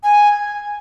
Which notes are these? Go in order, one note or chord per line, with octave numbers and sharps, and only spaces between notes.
G#5